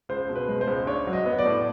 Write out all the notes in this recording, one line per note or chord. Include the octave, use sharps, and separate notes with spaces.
C#2 C5
B2
B4
G#3
C5
C#2
D4 C#5
F#3
D#5
B3
D5
A2